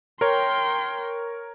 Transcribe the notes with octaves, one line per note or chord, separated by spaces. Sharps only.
A#4 C#5 G5 C6